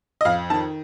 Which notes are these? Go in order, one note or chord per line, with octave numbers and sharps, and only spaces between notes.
D#5
F2 F5
D#3 A5